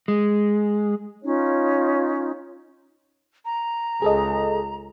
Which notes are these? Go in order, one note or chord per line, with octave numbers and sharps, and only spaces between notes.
G#3
C#4 D#4 F4 C#5
A#5
C#2 G#4 A4 D#5